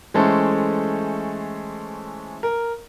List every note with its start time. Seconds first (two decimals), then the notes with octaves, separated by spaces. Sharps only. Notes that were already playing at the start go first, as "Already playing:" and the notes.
0.14 E3 G#3 A3 C#4 A4 C5
2.43 A#4